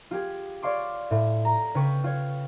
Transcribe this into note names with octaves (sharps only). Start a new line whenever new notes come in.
F4 G4 G#4
C#5 D5 F5 C6 D6
A2
A#5
C#3 B4 G5 C#6
F4 C#5